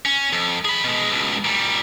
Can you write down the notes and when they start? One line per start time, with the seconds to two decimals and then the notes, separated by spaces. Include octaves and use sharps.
0.05 C#4
0.33 F2
0.65 G#4 B5
0.84 B2 G#3
1.11 C#2 B2
1.45 A#2 G3